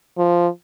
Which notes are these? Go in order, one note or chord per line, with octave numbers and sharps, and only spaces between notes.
F3